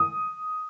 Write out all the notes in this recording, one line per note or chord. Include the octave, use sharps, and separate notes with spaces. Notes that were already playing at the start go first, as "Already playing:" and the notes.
Already playing: D#6